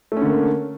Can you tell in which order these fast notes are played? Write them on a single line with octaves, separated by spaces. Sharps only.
A3 C#4 D3 A#3